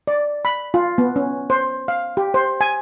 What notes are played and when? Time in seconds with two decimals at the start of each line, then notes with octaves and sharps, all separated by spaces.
0.07 D5
0.45 B5
0.74 F4
0.98 B3
1.16 C#4
1.50 C5
1.88 F5
2.17 G4
2.34 C5
2.61 G#5